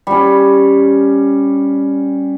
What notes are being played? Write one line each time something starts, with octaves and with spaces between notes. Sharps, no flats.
G3 C#4